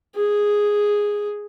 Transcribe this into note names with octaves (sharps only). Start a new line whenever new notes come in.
G#4